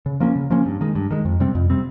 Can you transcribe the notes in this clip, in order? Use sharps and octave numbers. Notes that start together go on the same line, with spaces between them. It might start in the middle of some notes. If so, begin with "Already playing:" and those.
C#3
F3 A#3 C#4
C#3
F3 A#3 C#4
G2
D#3 G#3
G2
D#3 G#3
F2
C3 G3 C4
F2
C3 G3 C4